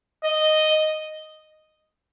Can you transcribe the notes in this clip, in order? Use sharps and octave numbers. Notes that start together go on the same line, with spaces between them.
D#5